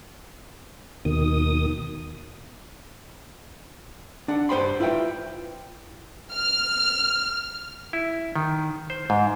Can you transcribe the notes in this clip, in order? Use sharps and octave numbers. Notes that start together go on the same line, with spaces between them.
D#2 B2 D#3 D#6
D4 F#5
G2 G3 C5 G5 B5 C6
E4 F4 B4 E5 F5 G5
F6
E4
D#3
C5
G#2